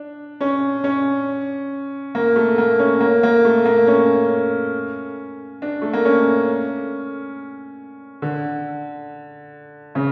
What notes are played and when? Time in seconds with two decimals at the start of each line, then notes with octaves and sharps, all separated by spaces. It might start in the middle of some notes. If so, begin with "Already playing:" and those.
Already playing: D4
0.41 C#4
0.84 C#4
2.15 A#3
2.36 A3
2.58 A#3
2.79 C#4
3.01 A#3
3.23 A#3
3.45 A3
3.66 A#3
3.87 C#4
5.62 D4
5.82 A3
5.93 A#3
6.05 C#4
8.22 D3
9.95 C#3